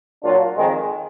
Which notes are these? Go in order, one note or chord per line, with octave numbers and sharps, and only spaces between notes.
A#2 F#3 D4 F4
F2 D#3 G#3